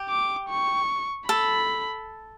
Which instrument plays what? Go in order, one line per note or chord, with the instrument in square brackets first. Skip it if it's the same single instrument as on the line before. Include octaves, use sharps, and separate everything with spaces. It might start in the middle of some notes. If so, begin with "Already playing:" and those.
Already playing: [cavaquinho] G4
[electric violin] D6
C#6
[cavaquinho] A4 [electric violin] B5